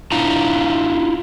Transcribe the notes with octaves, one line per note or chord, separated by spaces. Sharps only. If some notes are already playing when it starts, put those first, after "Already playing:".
D4 E4 F4 A#5